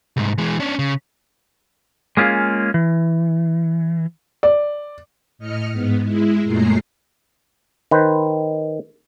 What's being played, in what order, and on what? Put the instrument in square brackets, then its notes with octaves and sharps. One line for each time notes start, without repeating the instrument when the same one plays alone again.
[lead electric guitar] C2 G#2
E3 G#3
C#4 D4
C#3
[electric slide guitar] G#3 A#3 C#4 F4 G#4
E3
[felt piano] D5
[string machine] A2 D#5 F6 C#7
G#2 B3
G#3 E4
F#2 A#2 G#3 A3 A#5 C7
[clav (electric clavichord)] D#3 B4 C5